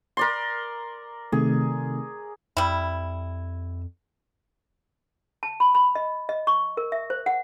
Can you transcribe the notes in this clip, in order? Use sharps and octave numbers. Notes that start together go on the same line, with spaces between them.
A#4 D5 C6
C3 D#3 A3 G#4
F2 G3 E4
A5
B5
B5
D#5
D#5
C#6
A#4
E5
C5
F#5